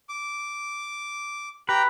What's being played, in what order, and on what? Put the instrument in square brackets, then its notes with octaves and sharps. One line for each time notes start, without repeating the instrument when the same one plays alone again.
[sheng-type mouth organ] D6
[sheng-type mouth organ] G4 G5 A#5 [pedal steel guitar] B4